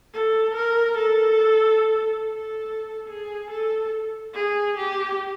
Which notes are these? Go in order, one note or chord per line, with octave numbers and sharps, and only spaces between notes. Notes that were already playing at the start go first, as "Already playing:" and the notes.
A4
A#4
A4
A4
G#4
A4
G#4
G4